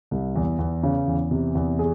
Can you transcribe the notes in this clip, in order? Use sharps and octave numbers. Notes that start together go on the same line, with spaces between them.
C2
E2
E2
C#3
E2
C3
E2
G#4